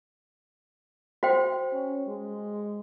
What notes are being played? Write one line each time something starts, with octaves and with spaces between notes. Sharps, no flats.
F#4 C5 G5
C#4
G#3